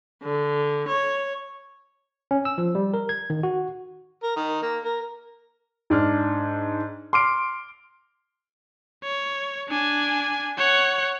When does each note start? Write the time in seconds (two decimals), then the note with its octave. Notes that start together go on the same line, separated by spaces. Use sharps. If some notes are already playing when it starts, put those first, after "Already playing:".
0.22 D3
0.87 C#5
2.31 C#4
2.45 E6
2.58 F3
2.75 G3
2.94 A#4
3.09 G#6
3.30 D#3
3.43 F#4
4.23 A#4
4.37 D#3
4.62 A#3
4.85 A#4
5.90 G#2 D4 F6
7.13 C6 D6 F6 D7
9.04 C#5
9.68 D4 G#5
10.57 C#5 F#5